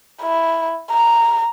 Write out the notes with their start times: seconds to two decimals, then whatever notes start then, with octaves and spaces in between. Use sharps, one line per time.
0.22 E4
0.91 A#5